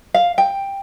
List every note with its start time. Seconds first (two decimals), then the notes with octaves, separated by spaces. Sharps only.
0.14 F5
0.38 G5